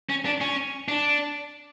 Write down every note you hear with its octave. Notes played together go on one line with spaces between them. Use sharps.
C#4
D4
C#4
D4